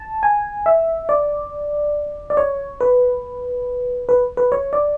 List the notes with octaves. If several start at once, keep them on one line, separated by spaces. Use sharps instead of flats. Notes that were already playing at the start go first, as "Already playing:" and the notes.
Already playing: A5
G#5
E5
D5
D5
C#5
B4
B4
B4
C#5
D5